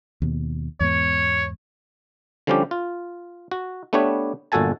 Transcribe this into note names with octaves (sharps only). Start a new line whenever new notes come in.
D#2 B2
E2 G#2 B3 C#5
D3 F3 G3 C#4 D4 G4
F4
F#4
A3 B3 D4 G4 B4 C#5
G1 A#2 F#4 A4 G#5 A5